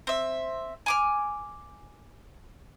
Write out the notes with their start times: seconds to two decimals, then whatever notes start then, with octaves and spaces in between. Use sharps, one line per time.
0.07 C4 E5
0.86 G#5 D6 F6